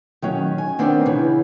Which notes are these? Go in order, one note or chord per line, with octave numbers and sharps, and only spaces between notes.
D#3 F#3 C#4
G#5
D#3 B3 C4 D4
C#3 E3